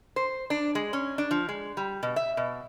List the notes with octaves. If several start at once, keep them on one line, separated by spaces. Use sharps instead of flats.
C5
D4
G#3
C#4
D4
F3
G#3
G3
B2
E5
B2